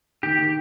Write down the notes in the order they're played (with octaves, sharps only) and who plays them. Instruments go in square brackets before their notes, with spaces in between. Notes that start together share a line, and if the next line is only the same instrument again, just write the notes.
[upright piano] D#3 [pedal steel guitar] G4
[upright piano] D#3